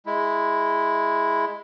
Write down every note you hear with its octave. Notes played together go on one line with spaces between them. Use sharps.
G#3 E4